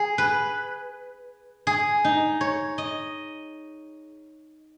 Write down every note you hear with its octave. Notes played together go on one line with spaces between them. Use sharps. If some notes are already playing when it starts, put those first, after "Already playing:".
Already playing: G#4
B4
G#4
D#4
C#5
D#5